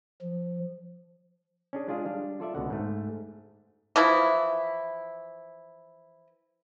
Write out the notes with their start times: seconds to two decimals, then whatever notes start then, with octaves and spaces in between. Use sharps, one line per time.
0.22 F3
1.73 C#4 D4 G#4
1.88 G#3 D4 F4 G#4 F5
2.06 G3 D4 F5
2.40 F4 A4 D5 E5
2.55 C#2 B2 D3 F#5
2.70 G#2 A3
3.96 E3 F3 E4